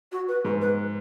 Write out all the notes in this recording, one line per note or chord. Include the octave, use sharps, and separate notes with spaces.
F#4
B4
G#2 B4
B4